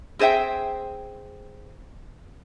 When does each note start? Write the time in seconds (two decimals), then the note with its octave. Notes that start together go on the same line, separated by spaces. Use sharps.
0.19 C4 G#4 C5 E5 G5